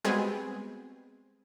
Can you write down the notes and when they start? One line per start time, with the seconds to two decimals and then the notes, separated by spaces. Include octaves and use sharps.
0.04 G3 G#3 B3 C4 F#4 G#4